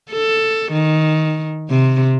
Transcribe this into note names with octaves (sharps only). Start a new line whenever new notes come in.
A4
D#3
C3